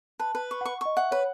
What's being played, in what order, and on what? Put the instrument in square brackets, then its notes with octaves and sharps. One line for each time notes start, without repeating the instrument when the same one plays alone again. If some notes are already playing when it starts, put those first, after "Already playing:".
[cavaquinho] B4 [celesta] A5
[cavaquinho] B4
C#6
[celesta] F#5 [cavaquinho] C#6
[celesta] D#5 [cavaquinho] C#6
[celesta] E5 [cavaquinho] F#5
[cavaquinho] B4 [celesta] C#5